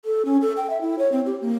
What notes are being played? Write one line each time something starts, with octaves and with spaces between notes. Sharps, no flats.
A4
C#4
A4
G5
E5
E4
C#5
C4
G4
A#3